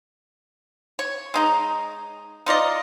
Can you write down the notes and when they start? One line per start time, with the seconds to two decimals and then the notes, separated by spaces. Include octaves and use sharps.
0.99 C#5
1.34 G#3 D#4 A#5
2.46 D#4 F4 D5 D#5